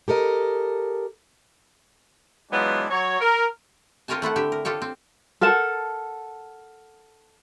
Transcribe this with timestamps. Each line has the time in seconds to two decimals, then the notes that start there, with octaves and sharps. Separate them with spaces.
0.08 G4 A4 A#4 D#5
2.52 E3 F#3 G#3 B3 D4 F4
2.90 F#3 C#5
3.21 A#4
4.08 C4 F4 A#4 C#5 G#5 A5
4.22 A3 E4 F4 F#5
4.36 D3 G4 E5
4.52 A#4
4.65 F4 G4 A4 C#5
4.82 C4
5.41 A4 A#4 F#5 A5